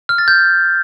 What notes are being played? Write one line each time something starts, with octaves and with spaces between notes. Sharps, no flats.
F6
A6
G6